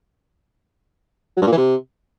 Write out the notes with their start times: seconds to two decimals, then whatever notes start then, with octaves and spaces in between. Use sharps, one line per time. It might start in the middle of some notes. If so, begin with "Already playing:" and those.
1.37 F#3
1.42 G2
1.47 A#2
1.52 E3
1.57 C3